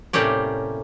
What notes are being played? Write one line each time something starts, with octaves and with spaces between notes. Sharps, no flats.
A2 C3 G3 A#3 C#4 D5